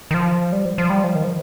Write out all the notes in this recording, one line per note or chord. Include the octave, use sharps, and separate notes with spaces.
D#3
F3
G3
F3
F3
G3
F3
D#3
F3